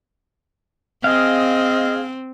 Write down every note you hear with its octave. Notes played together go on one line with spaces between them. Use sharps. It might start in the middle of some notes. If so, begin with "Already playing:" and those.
C4 G#4 D#5 F5